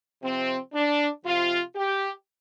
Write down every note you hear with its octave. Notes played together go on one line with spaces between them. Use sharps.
C3 F3 C4
D4
C3 F3 F4
G4